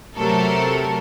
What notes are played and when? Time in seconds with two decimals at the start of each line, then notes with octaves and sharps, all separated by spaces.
0.17 C3 F#3 A3 A4 A#4